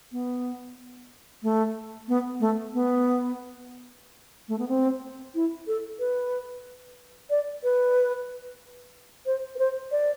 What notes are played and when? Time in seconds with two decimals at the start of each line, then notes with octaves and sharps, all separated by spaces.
0.12 B3
1.43 A3
2.08 B3
2.40 A3
2.74 B3
4.48 A3
4.59 B3
4.68 C4
5.35 E4
5.68 A4
5.99 B4
7.30 D5
7.64 B4
9.26 C5
9.55 B4
9.59 C5
9.91 D5